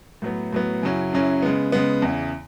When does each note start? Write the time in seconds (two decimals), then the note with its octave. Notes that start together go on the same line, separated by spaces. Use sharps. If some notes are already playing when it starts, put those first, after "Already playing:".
0.22 A2 F#3 B3
0.53 A2 F#3 B3
0.82 F#2 C#3 F#3 C#4 E4
1.12 F#2 C#3 F#3 C#4 E4
1.42 C#3 G#3 B3
1.72 C#3 G#3 B3
2.02 E2 C#3 E3